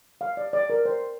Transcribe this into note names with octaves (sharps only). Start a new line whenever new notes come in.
F5
D5
D5
A#4
C5